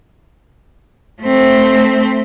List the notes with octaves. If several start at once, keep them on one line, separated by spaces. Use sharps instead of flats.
A3 C4